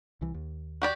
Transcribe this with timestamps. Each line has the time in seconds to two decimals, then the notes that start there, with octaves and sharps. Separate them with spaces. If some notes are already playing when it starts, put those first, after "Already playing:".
0.21 C2 E3
0.34 D#2
0.82 F#4 G4 D5